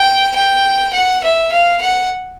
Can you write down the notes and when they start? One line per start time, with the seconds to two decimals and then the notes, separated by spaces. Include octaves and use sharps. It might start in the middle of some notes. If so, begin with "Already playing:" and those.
Already playing: G5
0.35 G5
0.93 F#5
1.24 E5
1.52 F5
1.81 F#5